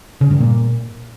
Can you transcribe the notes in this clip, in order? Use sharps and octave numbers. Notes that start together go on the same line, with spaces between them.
C#3
G2
A#2